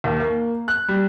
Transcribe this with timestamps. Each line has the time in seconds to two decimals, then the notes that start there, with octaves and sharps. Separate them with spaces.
0.04 D#2
0.20 A#3
0.68 F#6
0.89 G3